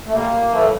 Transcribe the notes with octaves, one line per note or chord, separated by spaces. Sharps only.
A3
A#2 G3 A#3
A2 E3 G3 A3